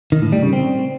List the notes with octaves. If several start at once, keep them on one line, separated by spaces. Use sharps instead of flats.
D#3
A2
G3
C#3
C4